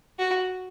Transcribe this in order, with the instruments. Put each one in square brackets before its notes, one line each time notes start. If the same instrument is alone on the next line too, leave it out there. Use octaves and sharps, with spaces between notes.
[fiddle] F#4